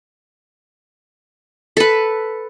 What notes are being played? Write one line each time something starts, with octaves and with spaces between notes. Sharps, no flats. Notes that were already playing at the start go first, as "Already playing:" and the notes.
A4 B4